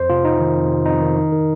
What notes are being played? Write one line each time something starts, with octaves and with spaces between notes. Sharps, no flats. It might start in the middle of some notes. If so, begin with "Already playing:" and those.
Already playing: F2 C5
C3 F4
F2 D#4
D#3
F2
C3
F2 D#4
D#3
D#3
D#3